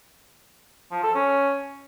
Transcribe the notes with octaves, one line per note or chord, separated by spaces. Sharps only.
F3
A4
C#4